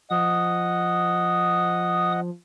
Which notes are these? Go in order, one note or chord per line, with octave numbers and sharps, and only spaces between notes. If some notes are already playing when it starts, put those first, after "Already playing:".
F3 D#5 F#5 D#6